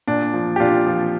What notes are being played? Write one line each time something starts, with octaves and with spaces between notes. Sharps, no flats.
A#2 D4
F3
G4
A#2 D4 F4
F3